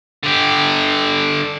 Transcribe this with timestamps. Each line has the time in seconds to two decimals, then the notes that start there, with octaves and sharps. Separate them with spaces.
0.23 D3 G4